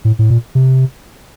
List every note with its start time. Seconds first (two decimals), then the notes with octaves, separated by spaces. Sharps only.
0.05 A2
0.19 A2
0.30 A#2
0.55 C3